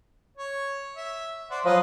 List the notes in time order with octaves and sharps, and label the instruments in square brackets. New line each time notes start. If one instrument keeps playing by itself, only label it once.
[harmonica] C#5
E5
C5 D5 F#5
[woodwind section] F3 F#3 [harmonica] B4 D#5 F5